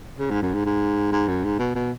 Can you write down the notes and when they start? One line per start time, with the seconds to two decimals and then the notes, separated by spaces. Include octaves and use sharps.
0.19 C#3
0.30 G#2
0.42 F#2
0.54 G#2
0.66 G#2
1.12 G#2
1.28 F#2
1.44 G#2
1.59 B2
1.75 B2